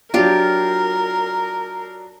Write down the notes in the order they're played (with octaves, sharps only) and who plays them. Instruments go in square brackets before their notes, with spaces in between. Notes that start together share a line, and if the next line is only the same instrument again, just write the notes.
[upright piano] F#3 D4 [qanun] F4 G4 [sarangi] A#4